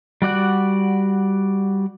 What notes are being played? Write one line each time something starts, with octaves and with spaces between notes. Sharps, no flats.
G3 F#4 D5 F#5